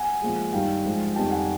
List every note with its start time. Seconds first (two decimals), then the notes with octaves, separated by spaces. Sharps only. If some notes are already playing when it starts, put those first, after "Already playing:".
Already playing: F#5 G#5
0.22 A#2 F3 G#3
0.53 G2 D#3 G3 F5 G5
0.84 G#2 F3 G#3
1.16 F2 C3 D#3 G3 G5 A5
1.31 F#5 G#5